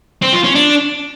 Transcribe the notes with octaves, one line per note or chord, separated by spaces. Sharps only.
C4
F4
C#4
D4